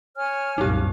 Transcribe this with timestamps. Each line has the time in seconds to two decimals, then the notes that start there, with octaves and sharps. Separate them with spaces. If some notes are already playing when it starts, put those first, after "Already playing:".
0.16 C#5 G#5 F6
0.58 C2 F#2 A#2 D#4 G4